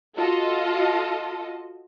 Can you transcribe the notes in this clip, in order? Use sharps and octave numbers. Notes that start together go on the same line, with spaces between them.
F4 F#4 A4 D#5 A5